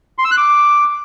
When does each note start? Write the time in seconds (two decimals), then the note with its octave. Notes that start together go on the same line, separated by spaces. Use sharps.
0.18 C6
0.25 E6
0.31 F#6
0.38 D6